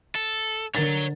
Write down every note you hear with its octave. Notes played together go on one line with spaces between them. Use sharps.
A4
D3 A#4 C#5 A#5 A6